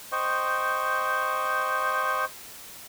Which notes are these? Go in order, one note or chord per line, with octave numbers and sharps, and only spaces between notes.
C5 D#5 G5 C#6